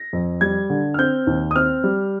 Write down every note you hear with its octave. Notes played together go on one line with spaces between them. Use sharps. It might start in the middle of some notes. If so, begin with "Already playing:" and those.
Already playing: A#6
F2
G3 G#6
D3
F6
C4 G6
D#2
D#6
C4 F6
G3